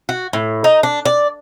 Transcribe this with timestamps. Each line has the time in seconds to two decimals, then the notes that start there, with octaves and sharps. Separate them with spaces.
0.09 F#4
0.33 A2
0.64 D#4
0.83 D4
1.05 D5